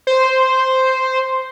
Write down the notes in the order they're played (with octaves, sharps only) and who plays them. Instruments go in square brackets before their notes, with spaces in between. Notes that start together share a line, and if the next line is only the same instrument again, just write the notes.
[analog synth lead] C5